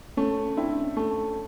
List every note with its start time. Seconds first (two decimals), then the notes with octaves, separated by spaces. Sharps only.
0.17 A3 C#4
0.57 C4 D4 E4
0.97 A3